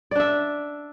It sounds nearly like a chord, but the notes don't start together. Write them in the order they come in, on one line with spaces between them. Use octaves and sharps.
D5 D4 E5